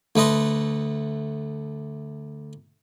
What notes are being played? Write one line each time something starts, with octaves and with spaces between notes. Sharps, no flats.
D2 A3 B4 D#5 C6